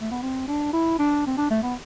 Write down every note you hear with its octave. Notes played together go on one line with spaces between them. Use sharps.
A3
B3
C4
D4
E4
D4
C4
D4
A3
B3